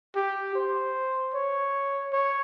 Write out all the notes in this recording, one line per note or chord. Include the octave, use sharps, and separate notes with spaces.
G4
C5
C#5
C#5